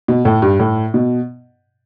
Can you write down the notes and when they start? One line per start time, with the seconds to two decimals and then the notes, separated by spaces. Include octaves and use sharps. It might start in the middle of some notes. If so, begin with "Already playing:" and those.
0.08 B2
0.25 A2
0.42 G2
0.59 A2
0.94 B2